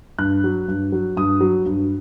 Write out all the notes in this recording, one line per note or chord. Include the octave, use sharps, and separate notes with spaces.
G2 F#6
F#3
G2
F#3
G2 D#6
F#3
G2